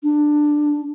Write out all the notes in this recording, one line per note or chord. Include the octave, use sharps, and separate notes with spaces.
D4